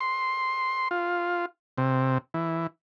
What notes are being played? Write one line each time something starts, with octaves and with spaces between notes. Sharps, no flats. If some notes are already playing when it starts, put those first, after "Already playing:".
C6
F4
C3
E3